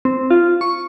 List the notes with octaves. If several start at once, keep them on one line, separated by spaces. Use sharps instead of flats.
C4
F4
C#6